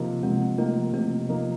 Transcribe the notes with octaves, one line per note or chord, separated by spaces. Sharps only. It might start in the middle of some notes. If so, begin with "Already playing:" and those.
Already playing: C3 F3 A#3 D#4
C3 G#3
F3 A3 A#3 D#4
C3 A3
F3 A#3 D#4